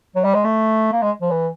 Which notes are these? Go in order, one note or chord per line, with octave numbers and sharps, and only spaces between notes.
F#3
G3
G#3
A3
A#3
G#3
F3
E3